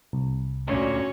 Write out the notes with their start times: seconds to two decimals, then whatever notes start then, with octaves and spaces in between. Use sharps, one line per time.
0.13 C2
0.68 D2 A#2 C#4 F#4 C#5